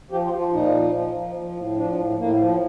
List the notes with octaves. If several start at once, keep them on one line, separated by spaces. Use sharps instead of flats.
F3 G4
F4
F3
F4
A#2 D#4
F3
F3
F3
F3
A2
F3 D4
A2
A2 A#3
F3